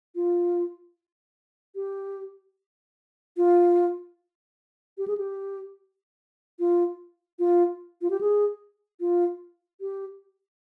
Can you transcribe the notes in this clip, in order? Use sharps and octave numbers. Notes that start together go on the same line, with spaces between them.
F4
G4
F4
G4
G#4
G4
F4
F4
F4
G4
G#4
F4
G4